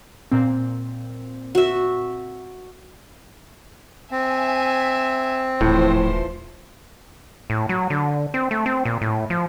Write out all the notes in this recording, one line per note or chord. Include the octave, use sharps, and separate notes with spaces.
A#2 C4
F#4 E5
C4 E5 G#5
D#1 A2 E3 F3 C5
A2
F#3
D3
C4
A3
C4
A#2
A2
F3